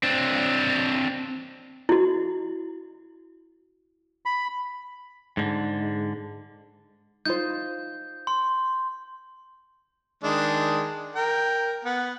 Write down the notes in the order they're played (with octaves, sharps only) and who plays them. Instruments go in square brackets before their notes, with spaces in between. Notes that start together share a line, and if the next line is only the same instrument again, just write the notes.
[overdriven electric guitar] C4 D4
[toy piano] E4 F#4
[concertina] B5
[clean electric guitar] G#2 D3
[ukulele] D#4 F4 C5 [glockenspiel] G6
[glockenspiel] C6
[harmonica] D#3 G#3 D4
A#4 G5
B3 F#5